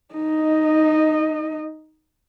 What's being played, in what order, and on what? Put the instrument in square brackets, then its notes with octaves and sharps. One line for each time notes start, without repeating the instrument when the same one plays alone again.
[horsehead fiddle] D#4 D#5